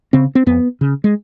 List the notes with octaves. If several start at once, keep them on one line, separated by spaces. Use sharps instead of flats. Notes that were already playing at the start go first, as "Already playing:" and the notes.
C#3 C4
C4
F2 B3
C#3
G#3